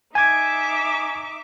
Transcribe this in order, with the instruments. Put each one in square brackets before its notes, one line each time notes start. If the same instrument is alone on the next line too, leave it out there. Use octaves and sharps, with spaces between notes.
[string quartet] D#4 E5 D6 [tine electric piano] G#5 G#6